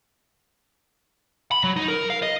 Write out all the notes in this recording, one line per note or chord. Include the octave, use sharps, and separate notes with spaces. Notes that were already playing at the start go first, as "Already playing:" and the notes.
B5
F#3
D#4
A#4
F5
D#5